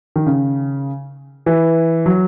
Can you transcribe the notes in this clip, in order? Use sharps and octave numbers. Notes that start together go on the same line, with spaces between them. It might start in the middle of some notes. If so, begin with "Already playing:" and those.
D#3
C#3
E3
F#3